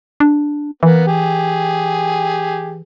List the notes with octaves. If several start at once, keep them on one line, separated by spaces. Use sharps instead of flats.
D4
E3 A#3 B3 B4
G4 G#4